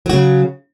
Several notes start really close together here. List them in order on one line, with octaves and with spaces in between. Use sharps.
F#3 F#4 C#3